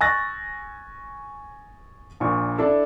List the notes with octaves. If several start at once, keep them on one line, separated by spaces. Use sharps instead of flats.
G#5 C#6 E6 F#6 A6 A#6
A#1 A#2 C#6
D4 E4 A4